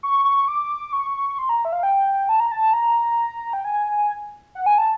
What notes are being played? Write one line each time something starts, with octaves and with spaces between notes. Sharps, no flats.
C#6
C#6
D6
C#6
C6
A#5
E5
F5
G5
A5
A#5
A5
A#5
G5
G#5
F#5
G#5
A5